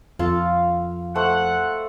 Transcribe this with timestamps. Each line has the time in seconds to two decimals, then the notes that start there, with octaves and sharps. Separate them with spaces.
0.19 F2 F4 A4 F5
1.15 A3 C5 F#5